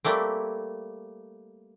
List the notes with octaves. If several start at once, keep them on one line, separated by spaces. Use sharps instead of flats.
G3 A3 A#3 C4